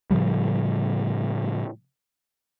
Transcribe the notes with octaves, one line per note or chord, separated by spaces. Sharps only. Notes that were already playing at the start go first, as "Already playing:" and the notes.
A2 C#3 F3 G3